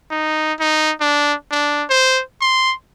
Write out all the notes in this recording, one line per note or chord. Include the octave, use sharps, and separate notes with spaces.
D#4
D#4
D4
D4
C5
C6